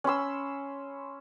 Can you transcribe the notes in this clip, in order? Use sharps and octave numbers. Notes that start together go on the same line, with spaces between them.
C#4 B5 C6 E6